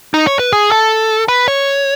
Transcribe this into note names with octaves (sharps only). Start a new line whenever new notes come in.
D#4
C#5
B4
G#4
A4
B4
C#5